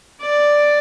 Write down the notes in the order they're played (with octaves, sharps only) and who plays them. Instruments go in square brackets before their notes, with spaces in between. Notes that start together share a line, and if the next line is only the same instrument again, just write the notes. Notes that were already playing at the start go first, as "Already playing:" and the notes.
[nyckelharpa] D5